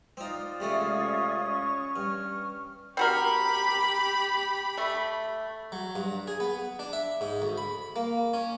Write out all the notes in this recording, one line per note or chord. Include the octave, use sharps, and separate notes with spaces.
C4 D#4 F4 D5 D#6
C3 G#3 A3 C#4 C#6
G2 F6
C4 F#4 G4 A#4 B5
A3
F#3
G2
G#4
B3
D4
E5
G#2
D2
B5
A#3
C#4